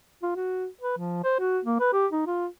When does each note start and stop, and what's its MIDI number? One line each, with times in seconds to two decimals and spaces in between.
0.23 0.31 65
0.36 0.67 66
0.81 0.97 71
0.98 1.21 53
1.24 1.36 72
1.39 1.59 66
1.65 1.79 58
1.80 1.90 71
1.93 2.07 67
2.12 2.23 63
2.27 2.47 65